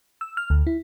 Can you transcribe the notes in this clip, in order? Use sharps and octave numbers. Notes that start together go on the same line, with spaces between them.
E6
F6
D2
E4